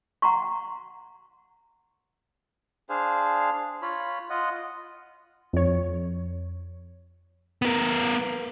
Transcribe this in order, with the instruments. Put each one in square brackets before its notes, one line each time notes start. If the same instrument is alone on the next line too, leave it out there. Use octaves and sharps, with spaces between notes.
[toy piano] F#5 A#5 C6 C#6
[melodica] D4 G#4 C5 F5
F4 C#5 B5
F4 D#5 F#5
[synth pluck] F2 C#5
[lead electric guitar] B3 A#4